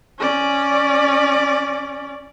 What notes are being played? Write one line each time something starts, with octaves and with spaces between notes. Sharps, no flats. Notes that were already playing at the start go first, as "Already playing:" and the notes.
C#4 D5